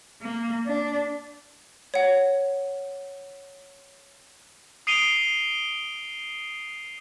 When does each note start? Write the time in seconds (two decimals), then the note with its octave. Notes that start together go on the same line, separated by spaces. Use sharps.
0.22 A#3
0.66 D4
1.94 C#5 F#5
4.87 D#6 C7 D7 D#7 F7 G7